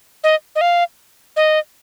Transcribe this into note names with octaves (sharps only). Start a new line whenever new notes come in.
D#5
D#5
F5
D#5